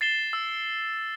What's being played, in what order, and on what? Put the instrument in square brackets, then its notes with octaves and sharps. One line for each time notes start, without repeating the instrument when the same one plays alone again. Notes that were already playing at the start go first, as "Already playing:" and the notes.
[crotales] A6 C7 E7 G7
E6